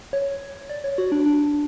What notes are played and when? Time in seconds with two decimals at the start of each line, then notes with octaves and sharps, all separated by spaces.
0.13 C#5
0.70 D5
0.84 C#5
0.98 F#4
1.12 D4
1.26 D4